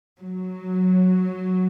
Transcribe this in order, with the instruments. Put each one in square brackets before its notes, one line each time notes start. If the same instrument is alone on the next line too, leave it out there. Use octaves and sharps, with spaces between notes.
[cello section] F#3